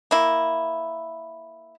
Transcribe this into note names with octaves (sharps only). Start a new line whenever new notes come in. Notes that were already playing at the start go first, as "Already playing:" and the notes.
A#3 E4